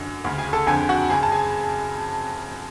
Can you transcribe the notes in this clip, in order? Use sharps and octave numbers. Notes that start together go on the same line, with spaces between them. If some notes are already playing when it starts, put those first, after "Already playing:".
Already playing: F#2 D3
D2 C#3
G#4 G#5
A4 A5
F2 D3 G#4 G#5
F#4 F#5
F#2 C#3 G#4 G#5
A5
G#4 G#5